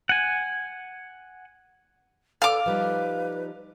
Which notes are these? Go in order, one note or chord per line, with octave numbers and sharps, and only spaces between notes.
F#5 G#5
A4 B4 D5 F5 D6 F6
F3 G3 D#4 B4